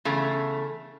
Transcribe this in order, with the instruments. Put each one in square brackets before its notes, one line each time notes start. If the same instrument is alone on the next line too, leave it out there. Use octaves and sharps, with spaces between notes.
[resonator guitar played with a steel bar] E2 C#3 A3